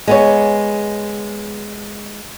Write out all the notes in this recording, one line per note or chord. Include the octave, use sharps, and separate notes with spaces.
G#3 B3 C#5